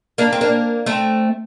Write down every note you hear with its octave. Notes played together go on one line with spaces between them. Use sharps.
A#3 D4
C4
A#3 D4
A3 C4